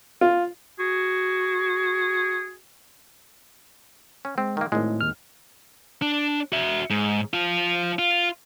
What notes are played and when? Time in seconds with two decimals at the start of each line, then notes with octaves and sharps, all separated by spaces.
0.21 F4
0.79 F#4 G#4
4.25 C#4
4.38 G#3 C4
4.57 D#3 A#3
4.72 G#1 A2 G#3
5.01 D#2 F6
6.02 D4
6.52 F#4 E5
6.90 G#2
7.33 F3 F4
7.99 F4